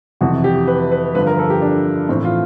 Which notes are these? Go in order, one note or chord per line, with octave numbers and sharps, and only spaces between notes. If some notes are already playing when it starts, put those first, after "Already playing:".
F2 C3 E3 F#4
G4
B4
B4
G2 D3 F3 B4
A#4
A4
G4
D4
A2 E3 C4
F4